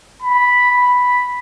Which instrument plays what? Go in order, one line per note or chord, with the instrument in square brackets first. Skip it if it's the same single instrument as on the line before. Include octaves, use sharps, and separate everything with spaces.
[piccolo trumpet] B5
B5